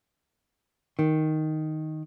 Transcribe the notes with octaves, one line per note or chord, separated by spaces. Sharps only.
D#3